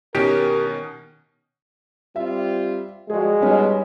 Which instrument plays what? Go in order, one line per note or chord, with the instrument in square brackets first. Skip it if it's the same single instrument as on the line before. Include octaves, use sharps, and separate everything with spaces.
[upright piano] B2 D#3 C#4 [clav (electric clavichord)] G4 [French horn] A#4
[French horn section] G3 C4 F4 [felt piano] E5
[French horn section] F3 G3 [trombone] G#3 [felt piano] F#4 G#4
[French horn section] B2 [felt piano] G3 C#4 D#4